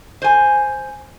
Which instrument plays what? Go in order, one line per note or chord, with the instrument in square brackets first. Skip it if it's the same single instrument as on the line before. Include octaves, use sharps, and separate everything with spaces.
[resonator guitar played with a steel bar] C5 G#5